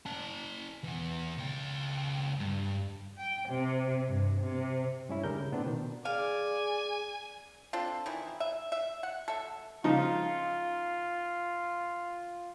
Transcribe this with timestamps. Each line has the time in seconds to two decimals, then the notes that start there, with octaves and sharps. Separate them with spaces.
0.06 C#4 A5
0.84 E3 B3
1.38 C#2 G5
2.40 G2
3.18 G5
3.49 C3
4.08 G2
4.41 C3
5.09 G2 C#4 E4
5.24 C#2 D3 G3 A#4 G6
5.36 C#3
5.52 A2 B3 C4 D4
5.66 B2 D#3
6.05 G#4 D5 F5 G#5
7.73 C4 D4 F4 A4
8.06 D#3 E3 E4
8.40 E5
8.72 E5
9.03 F#5
9.28 A4 E5
9.84 C#3 F3 D#4 F4